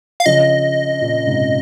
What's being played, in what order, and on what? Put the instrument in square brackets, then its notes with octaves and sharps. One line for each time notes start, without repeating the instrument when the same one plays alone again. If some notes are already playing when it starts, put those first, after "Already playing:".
[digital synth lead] F5
[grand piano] C#3 F3 [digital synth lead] D#5
[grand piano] A#2
G#2 C3